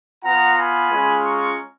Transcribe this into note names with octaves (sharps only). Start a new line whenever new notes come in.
B3 F4 F#5 A#5
G#5 B5
G#3 C#4 F4
A#5 C#6